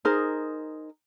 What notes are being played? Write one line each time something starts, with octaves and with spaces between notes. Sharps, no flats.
D#4 G#4 A#4 C5